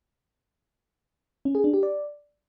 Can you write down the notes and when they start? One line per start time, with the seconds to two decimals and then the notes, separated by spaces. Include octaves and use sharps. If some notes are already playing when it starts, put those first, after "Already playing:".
1.45 C#4
1.55 G#4
1.64 D4
1.74 G4
1.83 D5